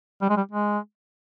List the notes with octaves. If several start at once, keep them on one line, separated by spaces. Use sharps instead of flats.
G3
G#3
G3
G#3